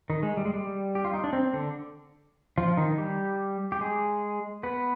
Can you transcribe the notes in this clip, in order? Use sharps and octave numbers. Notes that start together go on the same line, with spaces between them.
D#3 D#4
G#3
G3
G#3
G3
G4
F4
D#4
D4
C4
D3 D4
F3 F4
D#3 D#4
G3 G4
G4
G#3 G#4
B3 B4